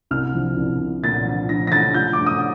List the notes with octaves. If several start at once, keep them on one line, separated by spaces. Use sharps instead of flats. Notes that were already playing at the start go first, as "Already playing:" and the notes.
C2 F6
F3
C2
C2
A#2 A6
F3
F3 A#6
A#6
F3 A6
F3 G6
G2 D6
D#6